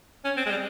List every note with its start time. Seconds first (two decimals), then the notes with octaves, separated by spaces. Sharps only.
0.25 C#4
0.37 C4
0.46 G#3
0.50 G3